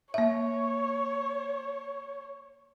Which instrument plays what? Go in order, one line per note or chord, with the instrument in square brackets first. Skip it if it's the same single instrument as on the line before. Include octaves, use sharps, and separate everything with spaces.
[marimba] A#3 E5 [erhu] C#5